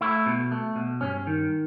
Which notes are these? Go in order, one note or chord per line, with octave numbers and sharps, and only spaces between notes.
A3 E4
B2
A3
B2
G2 C#4
D#3